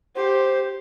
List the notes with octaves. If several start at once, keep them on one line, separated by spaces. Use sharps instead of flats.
G4 C5